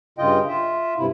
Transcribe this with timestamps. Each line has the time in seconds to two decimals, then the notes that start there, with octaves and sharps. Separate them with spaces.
0.18 G2 C#3 F4 D#5 G5
0.48 F4 E5
0.98 G2 C3 E4